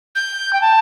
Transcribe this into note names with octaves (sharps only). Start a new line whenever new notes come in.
G6
G5
A5